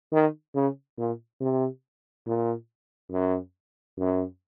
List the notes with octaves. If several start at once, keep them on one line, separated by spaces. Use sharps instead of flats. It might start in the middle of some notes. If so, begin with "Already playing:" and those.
D#3
C#3
A#2
C3
A#2
F#2
F#2